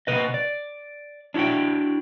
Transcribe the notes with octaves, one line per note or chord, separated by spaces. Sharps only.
C3 B4 D#5
D5
D4 E4 F#4 E5 G5